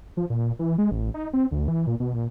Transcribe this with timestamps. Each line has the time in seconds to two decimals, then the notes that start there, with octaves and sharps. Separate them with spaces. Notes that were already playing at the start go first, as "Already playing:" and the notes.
0.17 F3
0.30 A#2
0.59 E3
0.78 G#3
0.91 A1
1.14 D#4
1.33 C4
1.51 D2
1.68 E3
1.87 A#2
2.00 B2
2.14 A#2